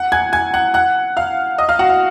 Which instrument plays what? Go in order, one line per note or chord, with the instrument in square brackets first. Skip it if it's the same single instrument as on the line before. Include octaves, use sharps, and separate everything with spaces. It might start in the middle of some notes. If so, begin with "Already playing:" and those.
Already playing: [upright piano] F#5 F#6
G#5 G#6
G#5 G#6
F#5 F#6
F#5 F#6
F5 F6
D#5 D#6
F5 F6
F#4 F#5
F5